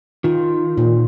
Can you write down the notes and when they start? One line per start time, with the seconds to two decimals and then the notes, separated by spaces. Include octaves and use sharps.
0.24 D#3 F4
0.77 A#2